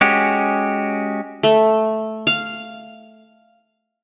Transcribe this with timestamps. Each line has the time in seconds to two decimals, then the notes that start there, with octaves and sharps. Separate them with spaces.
0.01 G#3 C#4 F#4 G4
1.43 A3
2.27 F5